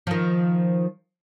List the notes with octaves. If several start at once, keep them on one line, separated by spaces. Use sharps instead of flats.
D#3 F3